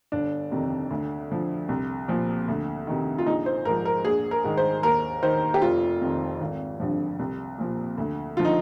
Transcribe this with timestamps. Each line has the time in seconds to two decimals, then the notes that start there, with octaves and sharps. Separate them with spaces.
0.12 G1 D4
0.51 F2 C3 D#3
0.91 D2
1.30 D3 F3
1.69 C2
2.08 A#2 F3
2.48 D2
2.87 C3 D#3
3.18 F4
3.26 A#1 D#4
3.46 C5
3.65 G#2 F3 A#4
3.85 A#4
4.05 A#1 G#4
4.31 A#4
4.44 G#2 D#3
4.57 C5
4.83 D#2 A#4
5.23 D#3 C5
5.54 G4
5.62 F1 F4
6.01 F2 D#3
6.41 G#1
6.80 G2 D3 F3
7.19 C2
7.58 A#2 F3
7.98 D2
8.37 D3 F3 F4
8.45 D#4